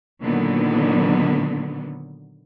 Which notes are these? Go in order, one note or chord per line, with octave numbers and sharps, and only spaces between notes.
A#2 D3 D#3 F#3 B3